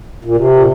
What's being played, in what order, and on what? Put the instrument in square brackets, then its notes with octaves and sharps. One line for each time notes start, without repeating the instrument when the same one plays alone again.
[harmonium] A#2
C3
A#2